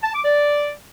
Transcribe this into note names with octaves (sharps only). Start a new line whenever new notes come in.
A5
D6
D5